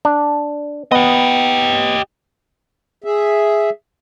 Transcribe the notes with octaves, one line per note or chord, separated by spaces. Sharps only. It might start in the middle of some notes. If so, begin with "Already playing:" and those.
D4
B3 G4 D#5
G#4 E5